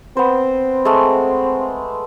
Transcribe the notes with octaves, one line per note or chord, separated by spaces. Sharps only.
B3 C4 C5
G#3 A3